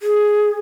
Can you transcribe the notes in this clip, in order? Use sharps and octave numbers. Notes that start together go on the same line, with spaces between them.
G#4